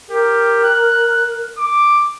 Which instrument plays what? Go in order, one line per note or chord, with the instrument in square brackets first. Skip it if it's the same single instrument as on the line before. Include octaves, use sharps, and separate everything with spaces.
[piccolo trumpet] G4 [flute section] A#4
[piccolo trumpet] F#6
D6